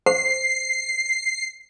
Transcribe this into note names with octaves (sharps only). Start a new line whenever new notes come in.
C5 C7